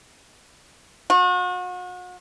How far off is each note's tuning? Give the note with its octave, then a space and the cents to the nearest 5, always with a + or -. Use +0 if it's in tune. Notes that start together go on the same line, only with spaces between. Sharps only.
F#4 -40